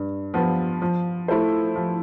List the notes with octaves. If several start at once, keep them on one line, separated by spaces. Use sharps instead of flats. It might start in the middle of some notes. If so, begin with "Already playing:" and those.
Already playing: G2
F3 B3 F4 B4
F3
A3 E4 A4 C5
F3